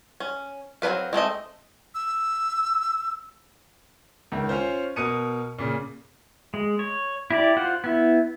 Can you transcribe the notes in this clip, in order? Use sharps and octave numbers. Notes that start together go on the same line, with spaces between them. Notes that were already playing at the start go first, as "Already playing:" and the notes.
C#4
F#3 C4 D4 B4 F5
G#3 A3 C4 D#5
E6
C#2 D#3
C#4 F4 C5
B2 A#4 D#6 C#7 D#7
A#2 C#3
G#3
C#5
E4 G4 D5
F4 C5 F#5
B3 E4